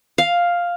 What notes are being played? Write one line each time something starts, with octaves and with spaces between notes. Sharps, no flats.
F5